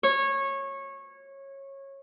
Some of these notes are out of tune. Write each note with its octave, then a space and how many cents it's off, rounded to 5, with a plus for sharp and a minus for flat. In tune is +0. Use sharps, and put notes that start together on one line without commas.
C#5 -20